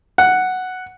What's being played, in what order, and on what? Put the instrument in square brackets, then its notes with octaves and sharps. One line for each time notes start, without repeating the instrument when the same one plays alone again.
[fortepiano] F#5